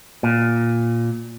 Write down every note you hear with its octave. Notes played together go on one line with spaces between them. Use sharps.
A#2